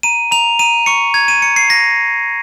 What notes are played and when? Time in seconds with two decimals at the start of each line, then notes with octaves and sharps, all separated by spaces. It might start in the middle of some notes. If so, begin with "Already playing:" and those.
0.03 A#5 D#7
0.31 A#5 F7
0.59 A#5 D#7
0.86 C#6 C#7
1.14 A#5 G#6
1.28 D#7
1.42 A#5 C#7
1.56 C7
1.70 C#6 A#6